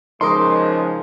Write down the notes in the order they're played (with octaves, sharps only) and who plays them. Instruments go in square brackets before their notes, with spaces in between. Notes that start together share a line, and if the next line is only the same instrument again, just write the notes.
[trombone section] C#3 F3 G#3 [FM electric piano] D#4 A#4 D#5 [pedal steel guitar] C6 D6